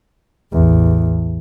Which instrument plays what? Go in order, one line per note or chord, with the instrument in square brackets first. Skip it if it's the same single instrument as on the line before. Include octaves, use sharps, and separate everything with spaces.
[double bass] A1 E2